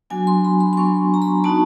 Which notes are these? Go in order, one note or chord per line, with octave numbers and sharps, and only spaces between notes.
F#3 B3 D4 F#4 G#5
C6
B5
C6
C6
F#3 B3 D4 F#4 C#6
A#5
B5
B3 D#4 F#4 A5